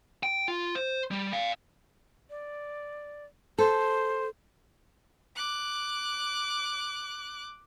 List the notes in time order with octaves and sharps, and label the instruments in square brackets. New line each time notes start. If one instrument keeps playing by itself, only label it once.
[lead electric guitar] G5
F4
C5
G3
D5 F5
[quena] D5
[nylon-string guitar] A4 [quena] C5
[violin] D6 F#6